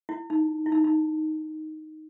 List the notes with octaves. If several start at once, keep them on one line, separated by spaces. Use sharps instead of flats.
E4
D#4
E4
D#4
D#4